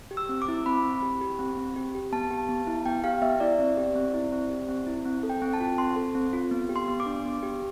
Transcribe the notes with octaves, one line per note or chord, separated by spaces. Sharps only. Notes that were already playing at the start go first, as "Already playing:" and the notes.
G4
E6
C4
D6
E4
C4 B5
C4
G4
G4
C4
C4
G4
G4
B3 A5
G4
B3
E4
B3 G5
G4 F5
B3 E5
E4 D5
C4
G4
C4
E4
C4
G4
C4
E4
C4
A4
G5
C4
A5
F4
C4 C6
A4
C4
F4
B3
G4
C6
B3
D6
D4
B3
G4